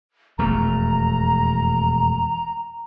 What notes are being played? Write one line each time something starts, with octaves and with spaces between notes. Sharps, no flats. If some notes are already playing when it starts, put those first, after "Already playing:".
E1 F2 A3 A#5